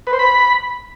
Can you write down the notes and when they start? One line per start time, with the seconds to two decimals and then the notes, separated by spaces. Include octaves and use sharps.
0.07 B4
0.13 C5
0.19 B5